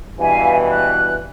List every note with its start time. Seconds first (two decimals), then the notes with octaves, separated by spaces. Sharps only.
0.19 G2 B2 E3 E5 F5 G#5
0.69 F#6